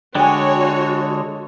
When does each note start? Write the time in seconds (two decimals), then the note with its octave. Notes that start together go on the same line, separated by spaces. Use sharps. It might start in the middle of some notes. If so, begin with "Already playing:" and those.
0.15 D3 G#3 D4 F#4 C#5 G5 G#5